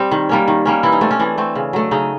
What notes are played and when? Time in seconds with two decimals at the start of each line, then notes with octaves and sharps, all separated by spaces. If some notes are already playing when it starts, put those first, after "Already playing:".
Already playing: G3 C4
0.11 D#3
0.29 G3 A#3 C#4
0.48 D#3
0.65 G3 A#3 C#4
0.83 E3 E4
0.92 D#4
1.01 A3 C4 D4
1.11 C#4
1.19 E3 D4
1.38 A3 C4
1.55 C#3
1.73 F#3 A3
1.91 C#3 D#4